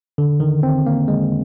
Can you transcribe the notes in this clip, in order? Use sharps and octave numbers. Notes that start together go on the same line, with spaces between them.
D3
D#3
C4
A#3
G#3